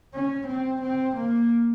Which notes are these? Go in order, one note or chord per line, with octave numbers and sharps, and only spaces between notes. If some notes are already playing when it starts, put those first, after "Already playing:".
C#4
C4
C4
A#3